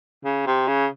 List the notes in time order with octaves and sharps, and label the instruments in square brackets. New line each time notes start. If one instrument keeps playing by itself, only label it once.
[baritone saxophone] C#3
C3
C#3